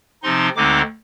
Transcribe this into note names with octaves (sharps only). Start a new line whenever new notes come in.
C3 F3 C4 D#4 C6
D2 D3 G#3 C4 D#4 D6